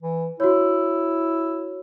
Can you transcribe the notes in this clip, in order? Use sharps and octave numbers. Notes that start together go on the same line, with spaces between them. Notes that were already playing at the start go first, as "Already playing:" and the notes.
E3
E4 F#4 C#5